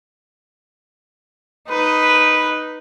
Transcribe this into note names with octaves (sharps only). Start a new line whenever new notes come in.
D#4 B4